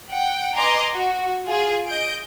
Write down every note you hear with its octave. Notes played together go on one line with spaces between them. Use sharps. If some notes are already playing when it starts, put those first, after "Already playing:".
F#5 G5
B4 D#5 G#5 A#5 C6 D6
F#4
F4 G#4
D#5 G6 D7